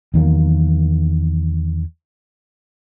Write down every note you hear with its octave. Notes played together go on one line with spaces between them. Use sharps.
E2 D#3 F#3 A#3